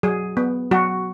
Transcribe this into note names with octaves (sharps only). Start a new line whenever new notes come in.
F#3 G#4
B3
F#3 F#4